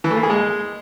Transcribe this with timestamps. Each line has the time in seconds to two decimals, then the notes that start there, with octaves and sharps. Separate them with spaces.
0.04 E3
0.11 A3
0.17 A#3
0.23 G#4
0.30 G#3